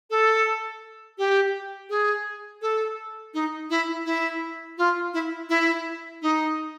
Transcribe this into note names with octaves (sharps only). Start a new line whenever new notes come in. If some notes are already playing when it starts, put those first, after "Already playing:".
A4
G4
G#4
A4
D#4
E4
E4
F4
E4
E4
D#4